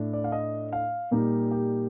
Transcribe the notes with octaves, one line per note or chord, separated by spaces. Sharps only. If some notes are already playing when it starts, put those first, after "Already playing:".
Already playing: A2 A3 D4
D5
F5
D#5
F5
A#2 G3 A#3 D#4 G4
G4